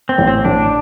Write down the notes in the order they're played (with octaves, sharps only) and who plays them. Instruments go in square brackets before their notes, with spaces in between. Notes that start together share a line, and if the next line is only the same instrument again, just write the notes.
[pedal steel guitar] C4
[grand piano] A1
[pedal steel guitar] C4
[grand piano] A1 [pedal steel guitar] D4